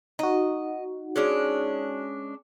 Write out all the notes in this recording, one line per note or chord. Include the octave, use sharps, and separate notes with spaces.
D#4 F#4 D#5
G#3 C#4 D4